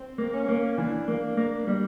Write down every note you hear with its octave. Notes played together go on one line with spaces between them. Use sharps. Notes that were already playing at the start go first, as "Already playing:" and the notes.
Already playing: C4
A#3
C#4
A#3
E3 D4
A#3
A#3
G3